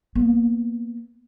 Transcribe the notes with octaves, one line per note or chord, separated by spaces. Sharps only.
A#3 B3